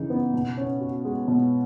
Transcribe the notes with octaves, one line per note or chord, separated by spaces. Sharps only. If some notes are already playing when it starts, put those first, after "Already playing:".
Already playing: C#3 E3 D#4
B3
B2
C#4
F#4
G#3
B2